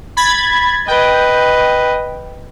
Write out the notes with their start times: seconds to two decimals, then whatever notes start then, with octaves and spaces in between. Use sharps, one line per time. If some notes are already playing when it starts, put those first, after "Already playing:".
0.17 B5 G#6 A6
0.88 B4 D#5 G5